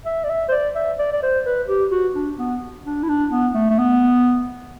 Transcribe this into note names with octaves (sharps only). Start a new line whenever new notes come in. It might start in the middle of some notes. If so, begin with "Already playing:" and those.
E5
D5
E5
C5
D5
E5
D5
D5
C5
B4
G4
F#4
D4
B3
D4
E4
D4
B3
A3
A3
B3